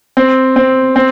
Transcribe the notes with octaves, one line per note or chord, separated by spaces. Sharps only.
C4
C4
C4